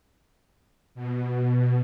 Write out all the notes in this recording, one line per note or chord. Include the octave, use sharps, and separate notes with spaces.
B2